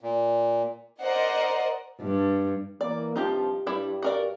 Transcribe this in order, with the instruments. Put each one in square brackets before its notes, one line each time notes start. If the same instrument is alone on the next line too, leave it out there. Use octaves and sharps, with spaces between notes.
[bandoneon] A#2
[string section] A#4 C5 D5 D#5 F#5
[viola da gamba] G2
[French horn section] E3 A#3 [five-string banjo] D5
[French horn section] G2 C3 F3 [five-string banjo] D#4 F4 G4
[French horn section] G2 [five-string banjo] G3 E4
[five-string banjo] F#4 A#4 D5